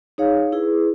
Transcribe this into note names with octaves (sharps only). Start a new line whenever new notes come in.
D#4 G#4 C#5 F5
E4 G#4 B4